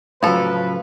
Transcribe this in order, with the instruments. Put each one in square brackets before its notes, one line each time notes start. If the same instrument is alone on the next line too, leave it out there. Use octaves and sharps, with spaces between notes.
[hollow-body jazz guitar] A2 C#3 F#3 [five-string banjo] F3 A4 [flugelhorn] B4